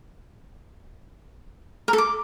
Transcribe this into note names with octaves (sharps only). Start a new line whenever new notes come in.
A#4
A4
D6